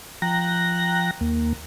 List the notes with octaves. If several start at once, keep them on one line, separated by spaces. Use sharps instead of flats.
F3 G5 A#5 F#6 A#6
D#2 A#3